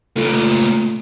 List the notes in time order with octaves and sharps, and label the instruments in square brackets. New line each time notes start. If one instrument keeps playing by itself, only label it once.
[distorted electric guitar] C#2 A#2 [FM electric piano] A3 F4